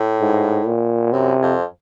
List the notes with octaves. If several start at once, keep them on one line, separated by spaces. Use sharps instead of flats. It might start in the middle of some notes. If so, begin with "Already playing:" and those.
Already playing: A2
G#2
A#2
F#2 C3
F2